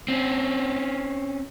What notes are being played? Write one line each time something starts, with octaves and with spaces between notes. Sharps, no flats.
C4 C#4